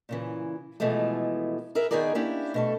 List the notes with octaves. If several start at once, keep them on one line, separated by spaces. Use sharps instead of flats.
A#2 C#3 E3
B2 E3 F3 G#3 A3
G#4 A#4 B4 E5
D#3 B3 D#4 G#4 A#4 D5
A#3 C#4 D4 E4 G4
B2 A3 A4